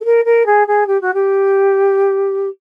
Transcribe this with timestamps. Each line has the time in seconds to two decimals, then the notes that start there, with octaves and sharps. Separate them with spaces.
0.01 A4
0.04 A#4
0.25 A#4
0.46 G#4
0.67 G#4
0.87 G4
1.01 F#4
1.14 G4